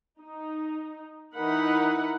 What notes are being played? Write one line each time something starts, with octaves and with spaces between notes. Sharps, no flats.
D#4
E3 D#4 E4 A#4 F#5 B5